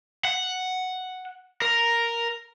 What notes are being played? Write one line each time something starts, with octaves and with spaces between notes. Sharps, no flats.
F#5
A#4